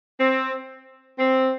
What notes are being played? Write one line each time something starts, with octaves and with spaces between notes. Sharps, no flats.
C4
C4